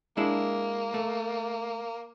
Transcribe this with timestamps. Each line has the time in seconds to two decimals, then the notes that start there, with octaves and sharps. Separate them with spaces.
0.17 G#3 A#3 D4 E4
0.94 A3